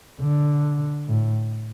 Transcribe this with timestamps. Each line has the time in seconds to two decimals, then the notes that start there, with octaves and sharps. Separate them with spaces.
0.21 D3
1.07 A2